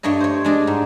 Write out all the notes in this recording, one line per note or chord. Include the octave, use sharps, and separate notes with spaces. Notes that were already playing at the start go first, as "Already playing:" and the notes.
G2 A3 D4 C#5 D#5
C5 C#5
G#3 D4 D5 D#5
G#2